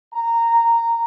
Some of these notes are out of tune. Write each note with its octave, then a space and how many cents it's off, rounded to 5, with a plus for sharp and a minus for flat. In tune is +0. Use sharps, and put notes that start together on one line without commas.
A#5 -10